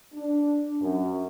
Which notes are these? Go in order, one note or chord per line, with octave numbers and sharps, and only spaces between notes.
D4
F#2